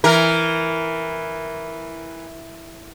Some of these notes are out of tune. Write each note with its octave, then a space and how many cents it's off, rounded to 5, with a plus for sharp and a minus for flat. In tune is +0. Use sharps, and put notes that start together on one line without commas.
E3 +0 A#4 +0